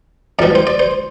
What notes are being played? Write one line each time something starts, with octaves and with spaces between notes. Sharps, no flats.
F2 E3 G3 D5
C5
D5
C5